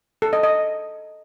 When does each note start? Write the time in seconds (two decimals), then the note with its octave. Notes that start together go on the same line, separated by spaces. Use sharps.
0.22 A4
0.33 D#5
0.43 D#5